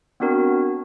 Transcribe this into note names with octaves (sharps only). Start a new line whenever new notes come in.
B3 C4 D4 F#4 A#4